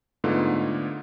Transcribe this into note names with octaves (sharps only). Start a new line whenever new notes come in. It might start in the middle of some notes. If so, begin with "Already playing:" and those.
G#2 D3 A3 B3 F4